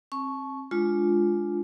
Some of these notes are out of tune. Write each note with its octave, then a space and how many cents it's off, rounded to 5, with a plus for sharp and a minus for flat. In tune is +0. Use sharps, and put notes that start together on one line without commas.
C4 +30 A5 -30 C#6 +0
G#3 +15 D4 +0 F4 +0